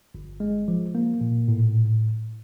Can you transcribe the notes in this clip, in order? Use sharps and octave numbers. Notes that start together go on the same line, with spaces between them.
G1
G#3
F3
A#3
A#2
A2